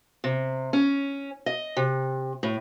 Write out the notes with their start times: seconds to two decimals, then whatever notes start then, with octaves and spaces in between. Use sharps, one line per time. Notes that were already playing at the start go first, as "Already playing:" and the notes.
0.24 C3
0.73 C#4
1.46 D#5
1.77 C3
2.43 A2